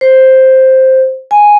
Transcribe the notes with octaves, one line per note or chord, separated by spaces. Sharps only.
C5
G#5